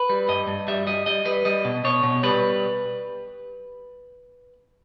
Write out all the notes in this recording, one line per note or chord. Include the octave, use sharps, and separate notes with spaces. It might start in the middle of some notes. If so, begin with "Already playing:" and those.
Already playing: B4
G3
G2 D#5
G2
G3 E5
G3 D#5
G3 D#5
G3 B4
G3 D#5
B2
B2 C#5
B2
G3 B4